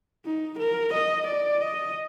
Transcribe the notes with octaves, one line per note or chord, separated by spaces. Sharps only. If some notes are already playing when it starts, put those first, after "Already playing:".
D#4
A#4
D#5
D5
D#5